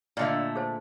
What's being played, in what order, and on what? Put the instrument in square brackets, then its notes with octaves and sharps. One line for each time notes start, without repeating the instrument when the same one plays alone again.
[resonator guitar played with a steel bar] A#2 D3 A3 [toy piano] D5 D#5 F5
[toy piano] G#4 C5 G#5